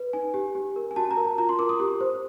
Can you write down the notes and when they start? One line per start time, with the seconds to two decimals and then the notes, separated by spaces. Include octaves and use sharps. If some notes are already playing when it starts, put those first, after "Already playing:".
Already playing: B4
0.13 D#4 G#5
0.34 G4
0.55 G4
0.76 A#4
0.91 G#5
0.96 F#4 A5
1.11 A#5
1.17 A#4
1.25 A5
1.38 F4 A#5
1.49 C6
1.59 A#4 D6
1.69 D#6
1.80 G4
2.00 C5